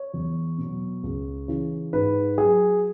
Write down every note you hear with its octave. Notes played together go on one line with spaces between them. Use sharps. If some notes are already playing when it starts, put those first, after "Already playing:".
Already playing: C#5
E2
B2 F#3
C#2
C#3 E3
G#2 B4
F#3 G#4